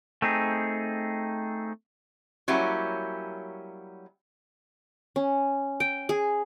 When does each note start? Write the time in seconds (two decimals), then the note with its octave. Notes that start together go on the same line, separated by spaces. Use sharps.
0.22 A3 C4 D#4 G#4
2.48 F#3 G3 A#3 C#4 E4
5.16 C#4
5.80 G5
6.09 G#4